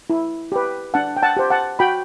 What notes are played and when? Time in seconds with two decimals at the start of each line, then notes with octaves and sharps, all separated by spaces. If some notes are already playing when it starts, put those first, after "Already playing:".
0.10 E4
0.52 G4 B4
0.94 D4 F#5 A5
1.17 G5
1.23 F#5 A5
1.37 G4 C5
1.50 F#5 A5
1.79 F#4 G5 B5